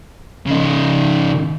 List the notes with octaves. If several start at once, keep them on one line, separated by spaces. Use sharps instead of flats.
C#3 D#4